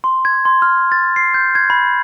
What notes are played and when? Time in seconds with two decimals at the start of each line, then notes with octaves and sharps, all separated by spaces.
0.04 C6
0.25 G#6
0.45 C6
0.62 F6
0.92 A6
1.16 C7
1.34 G6
1.55 G#6
1.70 B5